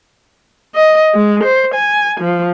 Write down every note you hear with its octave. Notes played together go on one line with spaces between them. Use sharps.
D#5
G#3
C5
G#5
F3